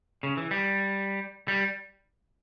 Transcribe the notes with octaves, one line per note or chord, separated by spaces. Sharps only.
C#3
E3
G3
G3